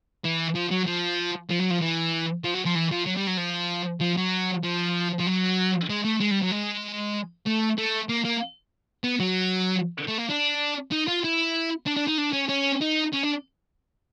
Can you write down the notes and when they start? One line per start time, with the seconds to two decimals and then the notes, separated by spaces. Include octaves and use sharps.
0.24 E3
0.55 F3
0.71 F#3
0.87 F3
1.50 F3
1.59 F#3
1.70 F3
1.81 E3
2.44 F3
2.54 F#3
2.65 F3
2.75 E3
2.91 F3
3.06 F#3
3.17 G3
3.27 F#3
3.37 F3
4.01 F3
4.17 F#3
4.63 F3
5.19 F3
5.26 F#3
5.89 G#3
6.04 A3
6.20 G#3
6.31 G3
6.42 F#3
6.52 G#3
7.46 A3
7.78 A3
8.09 A#3
8.25 A#3
9.04 B3
9.20 F#3
10.08 A3
10.18 A#3
10.30 D4
10.92 D#4
11.08 F4
11.24 E4
11.86 D4
11.97 D4
12.08 D#4
12.18 D4
12.33 C#4
12.49 C#4
12.81 D#4
13.13 C#4
13.23 D4